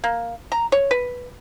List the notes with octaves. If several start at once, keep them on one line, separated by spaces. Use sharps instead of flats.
A#3
A#5
C#5
B4